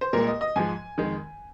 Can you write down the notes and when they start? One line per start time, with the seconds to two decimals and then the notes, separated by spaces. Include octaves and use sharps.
0.01 C5
0.13 C2 A#2 G#3 A#4
0.27 D#5
0.41 D#5
0.56 G#2 F3 G#3 G#5
0.98 F2 D#3 G#3